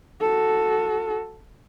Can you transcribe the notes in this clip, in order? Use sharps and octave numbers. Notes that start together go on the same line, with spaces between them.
F#4 A4